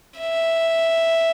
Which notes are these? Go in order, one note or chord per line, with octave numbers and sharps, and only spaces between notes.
E5